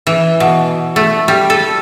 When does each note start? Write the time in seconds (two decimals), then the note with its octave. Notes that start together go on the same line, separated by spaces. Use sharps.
0.07 E3
0.40 B2
0.96 A3
1.28 G3
1.50 A4